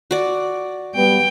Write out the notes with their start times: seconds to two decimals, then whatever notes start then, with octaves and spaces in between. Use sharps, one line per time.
0.11 F#4 D5
0.95 G3 B3 G5